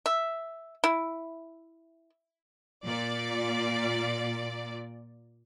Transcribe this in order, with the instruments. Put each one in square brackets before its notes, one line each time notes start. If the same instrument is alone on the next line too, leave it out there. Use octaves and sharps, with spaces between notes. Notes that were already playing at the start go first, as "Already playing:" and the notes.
[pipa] E5
E4
[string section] A#2 D5